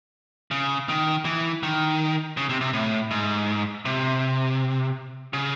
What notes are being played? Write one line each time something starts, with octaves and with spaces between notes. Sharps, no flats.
C#3
D#3
E3
D#3
C#3
C3
C3
A2
G#2
C3
C#3